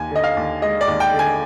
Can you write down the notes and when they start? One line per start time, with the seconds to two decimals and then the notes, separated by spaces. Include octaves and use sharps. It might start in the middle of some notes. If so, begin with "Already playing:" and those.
Already playing: D#2 G#5
0.11 D3 D#5
0.24 F5
0.37 D#2
0.62 G#3 D#5
0.81 D5
0.88 D#2
1.00 G5
1.13 D3
1.19 G#5